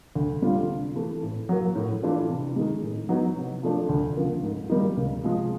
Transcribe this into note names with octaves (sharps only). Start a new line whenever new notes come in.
D2
D3 G3 C4 F4
C3
E3 A3
A2
F#3 A#3
A2
E3 A3 D4 F4
C3
D#3 G#3
A2
F#3 B3 D#4
C3
F3 A3 D4
D2
C#3 F3 A#3
G#2
D#3 G3 A#3 D#4
C#2
C3 F3 G#3